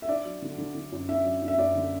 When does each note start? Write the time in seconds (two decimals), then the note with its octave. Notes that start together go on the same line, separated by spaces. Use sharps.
0.02 E5
0.09 D4 D5
0.25 F#3
0.42 D3
0.58 D3
0.75 D3
0.92 F#2
1.08 D4 E5
1.24 F#3
1.42 D4
1.48 E5
1.58 F#2 D5
1.75 D3